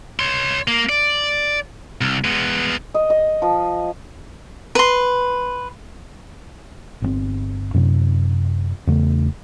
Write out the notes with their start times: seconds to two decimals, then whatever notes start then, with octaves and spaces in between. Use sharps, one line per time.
0.19 C#5 C6
0.68 A#3
0.89 D5
2.01 C2
2.24 G#3 B3
2.94 D#5
3.10 D#5
3.42 F3
4.75 B4 C6
7.02 G1 B2 C4
7.74 F#2 C3
8.87 E2 C#3 A3